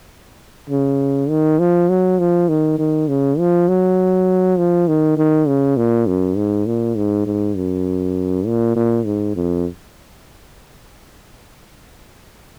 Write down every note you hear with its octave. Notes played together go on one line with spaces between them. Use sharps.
C#3
D#3
F3
F#3
F3
D#3
D#3
C#3
F3
F#3
F3
D#3
D#3
C#3
A#2
F#2
G#2
A#2
G#2
G#2
F#2
A#2
A#2
G#2
F2